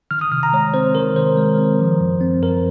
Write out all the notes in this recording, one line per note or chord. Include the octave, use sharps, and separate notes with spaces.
D#3 F6
D#6
C3 F6
A#5
G#3 C#5
C4 C5
D#3 A#4
C3 C5
G#3
C4
F3
F#2
C4
F#2 A#4